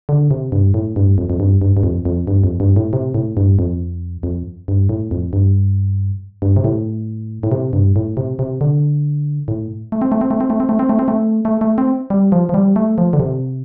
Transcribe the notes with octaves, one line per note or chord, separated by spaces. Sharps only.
D3
C3
G2
A2
G2
F2
F2
G2
G2
G2
F2
F2
G2
F2
G2
A2
C3
A2
G2
F2
F2
G2
A2
F2
G2
G2
C3
A2
A2
C3
G2
A2
C3
C3
D3
A2
A3
C4
A3
C4
A3
C4
A3
C4
A3
C4
A3
C4
A3
A3
A3
C4
G3
F3
F3
G3
A3
F3
D3
C3